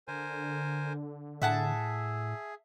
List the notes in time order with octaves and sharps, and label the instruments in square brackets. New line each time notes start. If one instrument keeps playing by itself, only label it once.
[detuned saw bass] D3 [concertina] A#4 C5 G#5
[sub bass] A2 [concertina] G#4 [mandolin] E5 F#5 A5